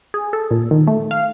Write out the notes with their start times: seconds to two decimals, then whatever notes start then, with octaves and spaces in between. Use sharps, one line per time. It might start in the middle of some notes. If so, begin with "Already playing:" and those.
0.14 G#4
0.33 A4
0.51 A#2
0.71 D#3
0.87 A3
1.11 F5